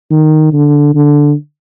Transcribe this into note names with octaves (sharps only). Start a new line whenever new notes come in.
D#3
D3
D3